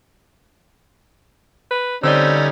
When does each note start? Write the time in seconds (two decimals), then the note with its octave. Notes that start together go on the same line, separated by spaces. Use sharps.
1.71 B4
2.03 D3 G3 C4 C#4 D#4 D5 E6